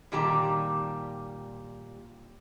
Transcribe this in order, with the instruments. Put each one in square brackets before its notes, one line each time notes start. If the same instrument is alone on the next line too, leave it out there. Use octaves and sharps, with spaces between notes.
[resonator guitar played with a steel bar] A#2 D#3 G3 G4 A5 A#5